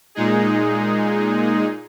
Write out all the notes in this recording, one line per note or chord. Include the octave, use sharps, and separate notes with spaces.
A#2 G#3 D#4 G#4